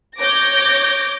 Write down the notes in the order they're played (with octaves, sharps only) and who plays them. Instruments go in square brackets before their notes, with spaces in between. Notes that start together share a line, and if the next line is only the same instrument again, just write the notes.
[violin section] C#5 D6 G6 A#6